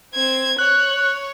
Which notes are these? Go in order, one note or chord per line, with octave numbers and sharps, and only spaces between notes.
C4 G#6
C#5 F#6